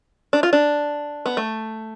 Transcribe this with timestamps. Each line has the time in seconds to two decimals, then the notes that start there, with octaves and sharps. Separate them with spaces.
0.33 D4
0.43 F4
0.53 D4
1.26 B3
1.37 A3